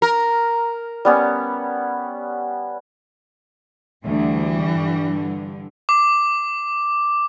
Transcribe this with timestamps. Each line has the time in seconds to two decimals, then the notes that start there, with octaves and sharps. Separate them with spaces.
0.02 A#4
1.05 G3 B3 C#4
4.04 D2 E3 G3
4.63 G2 D3
5.89 D6